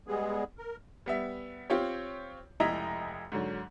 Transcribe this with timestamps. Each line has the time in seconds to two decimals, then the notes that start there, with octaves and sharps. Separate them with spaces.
0.08 G3 G#3 B3 G#4
0.58 A#4
1.06 G3 B3 E5
1.70 C4 F4 G4 C#5
2.60 F1 C#2 E4 D#5 E5 A#5
3.32 G#2 D3 F#3